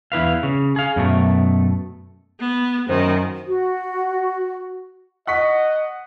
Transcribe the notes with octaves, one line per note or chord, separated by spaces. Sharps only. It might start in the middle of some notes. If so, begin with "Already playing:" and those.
E2 E4 B4 F5
C#3
G#4 F5
F#2 B2 A3
B3
F#2 D#3 C5
F#4
D#5 F#5 C#6 B6